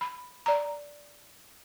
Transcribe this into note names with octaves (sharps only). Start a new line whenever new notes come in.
B5
D5 A#5